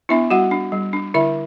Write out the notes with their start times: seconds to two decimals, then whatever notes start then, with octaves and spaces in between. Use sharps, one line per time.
0.09 B3 D4 E4 E5
0.30 G3 F#4 F#5
0.51 D4
0.72 G3
0.93 D4
1.14 D3 E4 E5